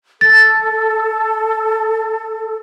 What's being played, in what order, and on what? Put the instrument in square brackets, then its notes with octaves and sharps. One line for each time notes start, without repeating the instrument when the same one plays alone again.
[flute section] A4 [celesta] A6